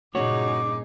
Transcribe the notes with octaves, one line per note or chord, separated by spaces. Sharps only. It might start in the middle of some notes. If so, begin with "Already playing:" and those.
G2 A#2 C#3 D#4 F#4 G#4 C#5 D6